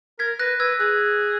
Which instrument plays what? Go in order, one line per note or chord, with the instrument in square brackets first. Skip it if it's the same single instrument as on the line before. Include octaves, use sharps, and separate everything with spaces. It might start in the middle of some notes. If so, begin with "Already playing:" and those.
[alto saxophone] A#4 [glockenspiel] G#6 B6
[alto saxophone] B4 [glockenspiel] F#6 A#6
[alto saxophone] B4 [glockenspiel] E6 G#6
[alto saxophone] G#4 [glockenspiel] F#6